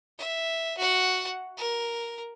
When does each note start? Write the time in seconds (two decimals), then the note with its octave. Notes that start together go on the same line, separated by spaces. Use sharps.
0.18 E5
0.78 F#4 F#5
1.57 A#4